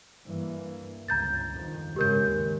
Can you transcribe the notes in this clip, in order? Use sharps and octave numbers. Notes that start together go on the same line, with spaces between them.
G2 E3 A#3
G1 C#2 A#5 G6 A6
F2 D#3
G#1 C#3 G#3 G4 A#4 G6
D#2 D#3